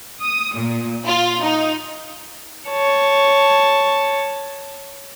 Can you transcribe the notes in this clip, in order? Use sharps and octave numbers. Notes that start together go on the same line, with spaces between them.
D#6
A#2
F4
D#4
C#5 A5